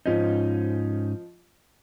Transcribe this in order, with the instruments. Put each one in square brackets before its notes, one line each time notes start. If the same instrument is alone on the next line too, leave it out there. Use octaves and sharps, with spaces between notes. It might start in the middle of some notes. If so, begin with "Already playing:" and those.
[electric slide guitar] G#2 C#4 D#4 [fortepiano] F3 D#5